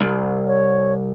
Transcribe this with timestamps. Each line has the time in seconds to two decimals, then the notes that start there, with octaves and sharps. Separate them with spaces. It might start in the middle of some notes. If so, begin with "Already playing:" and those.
0.01 C2
0.47 C#5